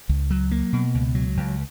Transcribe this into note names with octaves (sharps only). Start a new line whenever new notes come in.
C#2
F#3
A#3
B2
C#2
F#3
C#2